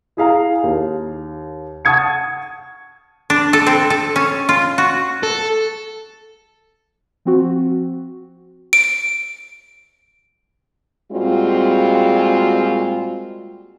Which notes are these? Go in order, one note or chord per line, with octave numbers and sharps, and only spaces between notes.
E4 G#4 F5 A#5
D#2
F#5 A5 C#6 D#6 G#6 C#7
D4
A4
C4
A4
C#4
F4
F#4
A4
F3 C4 F#4
D7
A#2 G3 G#3 C4 F4 F#4